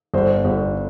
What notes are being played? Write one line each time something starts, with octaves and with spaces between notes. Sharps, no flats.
G1 C5
G1